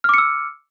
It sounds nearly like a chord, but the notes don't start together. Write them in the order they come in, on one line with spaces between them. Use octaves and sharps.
F6 D6 C#7 E6